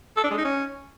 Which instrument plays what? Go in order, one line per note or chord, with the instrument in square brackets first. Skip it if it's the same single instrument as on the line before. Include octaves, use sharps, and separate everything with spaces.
[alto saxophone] A4
D4
G#3
D#4
C#4